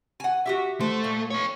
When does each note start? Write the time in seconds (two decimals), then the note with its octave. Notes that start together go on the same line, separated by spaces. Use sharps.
0.20 F#5 G#5
0.46 F#4 G4 E5
0.80 A3 C5
1.04 A#2
1.30 B3 C#5